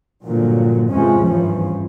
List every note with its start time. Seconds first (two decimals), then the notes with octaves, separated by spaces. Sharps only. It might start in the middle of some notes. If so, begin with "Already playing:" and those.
0.25 G2 A#2 D3 F3 F#3
0.90 E2 G#2 C3 F3 G#3 C#4
1.24 G#1 E2 G2 E3 F3 C#4